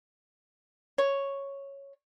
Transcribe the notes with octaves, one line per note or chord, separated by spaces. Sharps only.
C#5